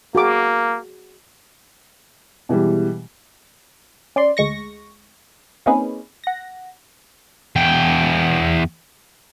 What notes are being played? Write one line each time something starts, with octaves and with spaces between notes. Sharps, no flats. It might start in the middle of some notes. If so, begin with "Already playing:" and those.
A#3 F#4 G#4 D6
B2 E3 G3 G#3
C#4 D5 C6
D2 G#3 C#6 A#6
A#3 C4 C#4 D#4 G#4 B4
F#5 A#6
E2 G5